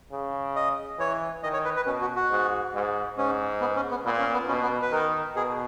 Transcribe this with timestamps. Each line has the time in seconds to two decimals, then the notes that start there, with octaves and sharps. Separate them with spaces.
0.12 C#3
0.56 D#5
0.99 E3 C#5
1.43 D#3 D#5
1.53 C#5
1.65 B4
1.76 B4
1.86 B2 C#4
2.01 F#4
2.16 F#4
2.30 G#2
2.74 G#2
3.18 G#2 C#4
3.61 B3
3.76 C#4
3.91 B3
4.05 A#2 B3
4.19 C#4
4.33 B3
4.48 B2 C#4
4.63 B3
4.82 B4
4.91 D#3 A#4
5.36 B2 G#4